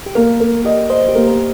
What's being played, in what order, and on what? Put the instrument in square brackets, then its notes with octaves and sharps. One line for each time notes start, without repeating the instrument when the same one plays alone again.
[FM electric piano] G4
[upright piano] A#3 [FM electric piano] A#4
[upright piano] A#3 [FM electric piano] A#4
[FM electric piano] G4 [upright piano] D#5
[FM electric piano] C5 [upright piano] D#5
[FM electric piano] G4
[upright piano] A#3
[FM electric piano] A#4